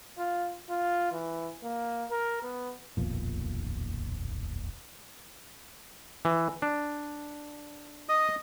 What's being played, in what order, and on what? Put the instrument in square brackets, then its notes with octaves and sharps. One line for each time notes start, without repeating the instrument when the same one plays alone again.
[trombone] F4
F4
E3
A#3
A#4
B3
[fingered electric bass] D#1 B1 F2 A#2
[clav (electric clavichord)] E3
D4
[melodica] D#5 D#6